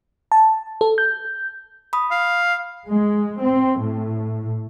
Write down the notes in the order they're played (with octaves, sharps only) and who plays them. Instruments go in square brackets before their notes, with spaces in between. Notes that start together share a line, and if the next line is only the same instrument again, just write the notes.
[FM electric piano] A5
A4
G6
[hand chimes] B5 D#6
[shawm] F5
[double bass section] G#3
C4
A2